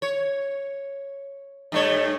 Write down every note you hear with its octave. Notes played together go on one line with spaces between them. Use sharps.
C#5
G2 A3 C#5